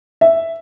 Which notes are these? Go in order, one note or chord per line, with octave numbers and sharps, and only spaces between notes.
E5